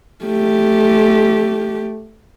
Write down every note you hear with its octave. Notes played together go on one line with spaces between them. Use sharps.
A3 G4